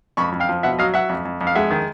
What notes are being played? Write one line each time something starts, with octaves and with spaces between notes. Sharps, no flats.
F2 B5 C#6
F2
F5 G5
F3
B2 E5 F#5
F#3 D#5 F5
F#3 E5 F#5
F2
F2
F2
F5
G#3 E5 F#5
D#3